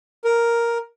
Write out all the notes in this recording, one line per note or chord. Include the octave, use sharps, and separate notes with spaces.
A#4